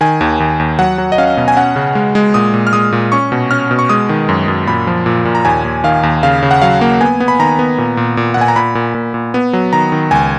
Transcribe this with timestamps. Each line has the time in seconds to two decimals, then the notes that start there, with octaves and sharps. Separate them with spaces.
0.01 D#3 G#5
0.21 D#2
0.40 D#2
0.60 D#2
0.79 F#3 F#5
0.98 F#3
1.12 D#5
1.18 C#4 F5
1.37 B2
1.48 G#5
1.57 C#4 F#5
1.76 C#3
1.95 G#3
2.15 G#3
2.34 A#2 D#6
2.54 A#2
2.67 F6
2.73 G#3 D#6
2.92 A#2
3.12 C#4 C#6
3.32 B2
3.51 C#4 F6
3.71 B2
3.79 C#6
3.89 G#3 D#6
4.09 D#3
4.29 F#2
4.48 F#2
4.67 A#2 B5
4.87 F3
5.06 A#2
5.25 A#2
5.35 A#5
5.45 D#2 G#5
5.65 D#2
5.84 D#3 F5
6.03 D#2
6.23 C#3 F5
6.43 C#3
6.51 F#5
6.62 F#3 F5
6.81 A#3
7.01 B3 G#5
7.20 B3
7.28 B5
7.39 D#3 A#5
7.59 B3
7.78 A#2
7.97 A#2
8.17 A#2
8.34 F#5
8.37 A#2 G#5
8.48 A#5
8.56 A#2 B5
8.75 A#2
8.95 A#2
9.14 A#2
9.34 B3
9.53 F#3
9.73 D#3 A#5
9.92 D#3
10.11 C#2 G#5